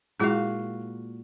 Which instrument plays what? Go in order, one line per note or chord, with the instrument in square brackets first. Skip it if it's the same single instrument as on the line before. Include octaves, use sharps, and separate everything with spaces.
[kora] A#2 F#4 F5 [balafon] G#3 E4 G#4